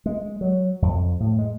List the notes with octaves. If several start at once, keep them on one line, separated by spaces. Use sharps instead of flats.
G#3
F#3
F2
A2
G#3